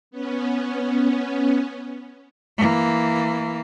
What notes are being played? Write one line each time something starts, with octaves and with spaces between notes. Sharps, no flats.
B3 C#4
E3 A#3